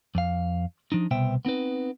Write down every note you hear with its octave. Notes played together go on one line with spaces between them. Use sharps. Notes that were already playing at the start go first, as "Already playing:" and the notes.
F2 F5
F3 D4 D#4
C2 B2 B3 C5 E5 G5
B3 C4 D#4 B4